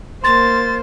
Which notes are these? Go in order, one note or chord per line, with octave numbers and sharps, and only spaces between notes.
A#3 C5 C6 A6